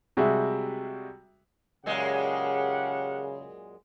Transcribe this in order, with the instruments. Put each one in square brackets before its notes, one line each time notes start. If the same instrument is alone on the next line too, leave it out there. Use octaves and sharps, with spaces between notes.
[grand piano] C3 G3 G#3 F#4 G#4 E5
[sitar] F#2 A#2 G#3 [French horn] C#3 [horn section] G4 A#4 F#5